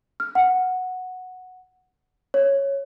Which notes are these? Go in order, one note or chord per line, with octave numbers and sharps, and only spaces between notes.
F6
F#5
C#5